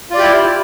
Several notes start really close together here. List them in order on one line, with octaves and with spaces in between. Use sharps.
F4 D5 G4 E4